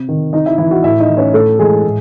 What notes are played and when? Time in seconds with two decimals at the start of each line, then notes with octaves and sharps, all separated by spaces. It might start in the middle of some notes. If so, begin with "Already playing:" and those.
Already playing: C3
0.09 D#3
0.33 C3 D#4 D#5
0.46 E4 E5
0.58 E3 E4 E5
0.71 F#4 F#5
0.84 A2 E4 E5
1.00 D#4 D#5
1.09 E3
1.17 C#4 C#5
1.34 A2 A3 A4
1.59 E3 G#3 G#4
1.84 A2